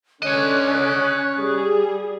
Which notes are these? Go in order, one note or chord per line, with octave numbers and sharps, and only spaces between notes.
D3 C#4 C#5 D#5 F#6
G3 G#4